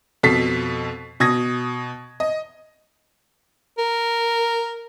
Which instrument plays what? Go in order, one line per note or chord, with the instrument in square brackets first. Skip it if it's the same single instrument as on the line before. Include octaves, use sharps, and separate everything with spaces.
[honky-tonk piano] F2 B2 A4 B6 C7
B2 D#6 G#6 A#6
D#5
[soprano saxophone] A#4